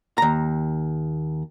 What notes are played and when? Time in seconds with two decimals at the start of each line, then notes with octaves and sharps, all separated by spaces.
0.18 D#2 A#5